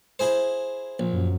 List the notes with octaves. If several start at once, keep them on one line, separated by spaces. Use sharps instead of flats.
E4 G#4 C5
A#1
F#2